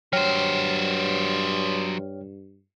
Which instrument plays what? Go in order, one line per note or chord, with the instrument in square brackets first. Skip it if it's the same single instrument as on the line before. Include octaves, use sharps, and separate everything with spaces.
[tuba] G2 [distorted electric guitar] F#3 C5 [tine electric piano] C#5 G5 F6